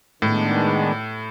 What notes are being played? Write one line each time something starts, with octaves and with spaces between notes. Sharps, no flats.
A2 D#3 G#3 B3 D4